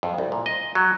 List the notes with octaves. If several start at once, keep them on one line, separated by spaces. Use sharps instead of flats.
F2
C2
A#2
D#5
F#3